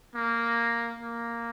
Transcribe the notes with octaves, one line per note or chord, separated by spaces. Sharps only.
A#3
A#3